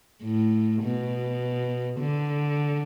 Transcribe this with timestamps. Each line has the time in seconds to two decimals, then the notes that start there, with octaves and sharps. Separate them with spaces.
0.23 A2
0.82 B2
2.00 D3